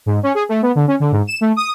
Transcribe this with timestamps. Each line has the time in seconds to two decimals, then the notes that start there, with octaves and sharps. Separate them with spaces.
0.06 G#2
0.23 C#4
0.35 G#4
0.49 A3
0.62 B3
0.75 D3
0.88 C#4
1.00 D3
1.12 G#2
1.27 E7
1.41 A3
1.56 D#6